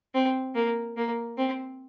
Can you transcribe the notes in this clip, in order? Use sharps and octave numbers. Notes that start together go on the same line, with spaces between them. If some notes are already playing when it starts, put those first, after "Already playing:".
C4
A#3
A#3
C4